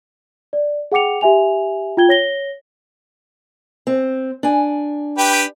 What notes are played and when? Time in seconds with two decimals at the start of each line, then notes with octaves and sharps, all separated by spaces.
0.53 D5
0.92 G#4 F#5 G5 D6 C#7 F7
1.21 G4 E5 G#5 F7
1.97 F4 G5 G#6 G7
2.09 C#5 A#6 G7
3.87 C4
4.43 D4 G#5
5.18 G4 B4 G5